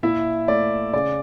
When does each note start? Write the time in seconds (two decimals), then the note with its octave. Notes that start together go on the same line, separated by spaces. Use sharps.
0.03 A#2 E4 E5
0.48 A3 D5
0.93 C#3 D5